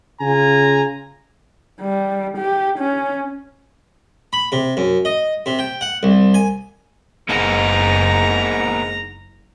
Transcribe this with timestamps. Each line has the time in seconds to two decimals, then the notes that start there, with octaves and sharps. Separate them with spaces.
0.21 C#3 F4 G#5 A#5
1.81 G3
2.38 G4
2.78 C#4
4.33 B5
4.52 C3
4.77 F#2
5.05 D#5
5.46 C3
5.59 G5
5.81 F#5
6.03 C2
6.34 G#5
7.29 F#1 G#2 A#3 B3 D#4 A#5